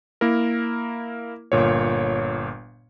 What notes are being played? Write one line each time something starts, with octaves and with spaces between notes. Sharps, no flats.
A#3 E4 A#4
G1 A#2 C#5